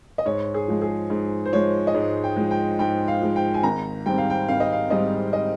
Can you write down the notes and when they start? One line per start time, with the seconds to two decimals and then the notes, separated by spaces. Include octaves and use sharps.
0.18 D#5
0.25 G#2 C#5
0.54 G#4
0.68 F3 G#3
0.82 G#4
1.10 G#2
1.45 C5
1.53 F3 G#3 C#5
1.87 D#5
1.95 G#2 C#5
2.24 G5
2.36 F3 G#3
2.51 G5
2.79 G#2 G5
3.08 F5
3.21 F3 G#3
3.36 G5
3.54 G#5
3.63 G#1 A#5
4.06 G#2 G3 C4 G5
4.18 F5
4.30 G5
4.48 G#1 F5
4.60 D#5
4.72 F5
4.90 G#2 G3 C4 D#5
5.33 D#5